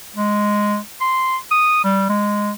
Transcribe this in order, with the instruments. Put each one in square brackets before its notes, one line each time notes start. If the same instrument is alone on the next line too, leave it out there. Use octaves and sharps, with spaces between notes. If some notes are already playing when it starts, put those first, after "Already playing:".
[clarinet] G#3
C6
D#6
G3
G#3